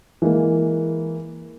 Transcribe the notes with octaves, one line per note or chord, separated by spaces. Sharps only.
E3 G#3 A#3